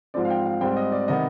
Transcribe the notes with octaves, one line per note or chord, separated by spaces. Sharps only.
G#2 F3 C4 D5
F5
G5
F5
G#2 G3 C4 G5
D#5
D5
C3 D#3 B3 D#5